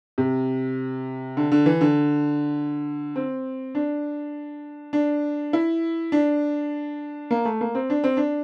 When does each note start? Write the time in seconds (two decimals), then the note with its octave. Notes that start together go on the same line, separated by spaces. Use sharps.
0.18 C3
1.37 D3
1.52 D3
1.66 E3
1.81 D3
3.16 C4
3.75 D4
4.93 D4
5.53 E4
6.12 D4
7.31 A#3
7.45 A3
7.61 A#3
7.75 C4
7.90 D4
8.04 C4
8.17 D4